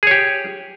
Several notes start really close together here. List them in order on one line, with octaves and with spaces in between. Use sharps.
G#4 C#5 G4